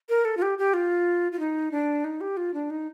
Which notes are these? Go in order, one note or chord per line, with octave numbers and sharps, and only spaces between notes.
A#4
A4
F4
G4
G4
F4
F4
D#4
D4
D#4
G4
F4
D4
D#4